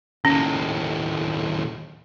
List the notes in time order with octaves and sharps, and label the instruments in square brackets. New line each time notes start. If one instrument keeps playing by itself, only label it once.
[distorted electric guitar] D#2 A2 [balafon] C#4